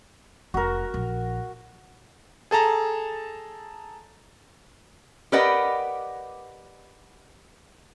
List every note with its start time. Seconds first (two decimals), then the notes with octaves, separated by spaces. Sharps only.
0.54 F1 F#4 A#4
0.94 A#1
2.51 G#4 A4 A5 A#5
5.32 G4 A#4 B4 D5 D#5 F#5